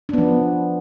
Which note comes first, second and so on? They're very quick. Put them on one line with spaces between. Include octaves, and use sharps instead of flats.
D4 B3 F3